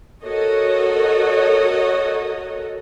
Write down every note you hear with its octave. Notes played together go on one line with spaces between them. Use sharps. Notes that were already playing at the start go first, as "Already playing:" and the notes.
F#4 A4 A#4 C#5 D#5